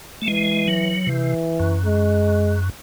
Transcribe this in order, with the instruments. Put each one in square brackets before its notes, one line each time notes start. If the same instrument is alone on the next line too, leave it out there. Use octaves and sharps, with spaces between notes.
[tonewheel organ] A3
[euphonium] E3 [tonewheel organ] G#3
[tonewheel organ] F#3
[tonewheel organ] C3 [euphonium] E3
[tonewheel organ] F#2
[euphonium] G#3